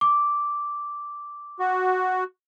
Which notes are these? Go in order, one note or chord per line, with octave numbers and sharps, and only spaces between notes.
D6
F#4